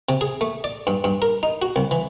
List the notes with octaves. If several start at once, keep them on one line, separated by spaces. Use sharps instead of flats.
C3
G#4
A3
D5
G2
G2
A#4
D#4
F#4
C2
E3